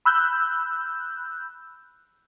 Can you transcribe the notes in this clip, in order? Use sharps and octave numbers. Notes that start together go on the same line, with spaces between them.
B5 E6 F#6 G6